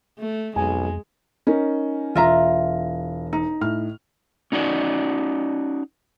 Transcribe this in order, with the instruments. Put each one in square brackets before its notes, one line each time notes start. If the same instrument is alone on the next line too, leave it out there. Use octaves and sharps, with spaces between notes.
[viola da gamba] A3
[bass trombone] B1 [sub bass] F2 [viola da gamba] G#3 [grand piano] G#5
[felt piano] C#4 D#4 A#4
[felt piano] E1 A#6 [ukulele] F4 E5 A#5
[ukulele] D#4
[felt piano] A2 F6
[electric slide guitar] C#4 D#4 F#4 D5